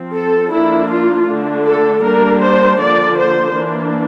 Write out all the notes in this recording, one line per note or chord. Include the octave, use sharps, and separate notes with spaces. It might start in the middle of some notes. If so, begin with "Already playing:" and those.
Already playing: F3 C4
A4
F3 A#3 D4 E4
F4
D3 A3 D4
A4
G3 A#3 D4 A#4
C5
D3 F3 A#3 D5
C5
E3 A#3 D4